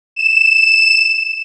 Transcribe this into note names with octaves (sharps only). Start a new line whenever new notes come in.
E7